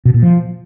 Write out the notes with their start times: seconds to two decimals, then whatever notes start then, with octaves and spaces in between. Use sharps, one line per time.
0.05 B2
0.14 A#2
0.23 F3